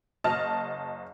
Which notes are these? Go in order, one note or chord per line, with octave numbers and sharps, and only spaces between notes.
F#1 D#5 A5 F6